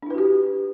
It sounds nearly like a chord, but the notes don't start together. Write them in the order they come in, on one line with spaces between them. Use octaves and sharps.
D4 E4 B4 F#4 G4